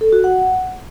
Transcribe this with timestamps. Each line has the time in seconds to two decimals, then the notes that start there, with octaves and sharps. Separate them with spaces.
0.01 A4
0.12 F#4
0.24 F#5